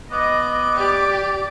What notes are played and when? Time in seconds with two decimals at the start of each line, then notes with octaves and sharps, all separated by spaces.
0.11 B3 D#5 D6
0.76 G4 D5